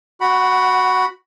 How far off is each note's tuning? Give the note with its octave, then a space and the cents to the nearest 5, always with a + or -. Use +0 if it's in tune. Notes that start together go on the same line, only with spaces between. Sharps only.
F#4 +0 F#5 +20 B5 +0